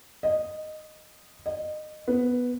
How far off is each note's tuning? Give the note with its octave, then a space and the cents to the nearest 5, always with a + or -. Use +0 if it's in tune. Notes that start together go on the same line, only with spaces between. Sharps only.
D#5 -10
D#5 -25
B3 +0